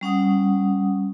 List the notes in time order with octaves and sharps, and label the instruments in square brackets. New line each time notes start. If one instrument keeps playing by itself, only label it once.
[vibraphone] G3 C#4 F#5 D#6